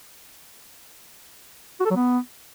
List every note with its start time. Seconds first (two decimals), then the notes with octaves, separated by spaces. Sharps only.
1.80 F#4
1.85 A4
1.91 F#3
1.96 B3